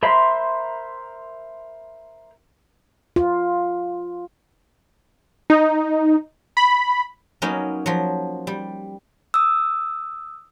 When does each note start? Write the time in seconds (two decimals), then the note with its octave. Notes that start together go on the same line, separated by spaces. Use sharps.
0.03 A#4 C5 E5 B5 C6
3.16 F4
5.50 D#4
6.57 B5
7.42 F#3 A#3 B3 C#4 D#4
7.86 F3 F#3
8.47 G3
9.34 D#6 E6